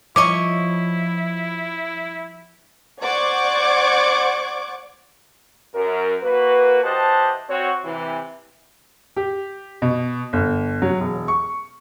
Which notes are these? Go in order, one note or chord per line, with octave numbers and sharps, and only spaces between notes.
F3 E4 C#5 D#5 C#6 D6
C5 D5 F#5 C#6 D6 G#6
F#2 A#4
A#3 F#4 B4
E3 G4 C5 D#5 F#5 A5
C4 F#4 C#5
C3 E3
G4
B2
G1
F#3
E1
C#6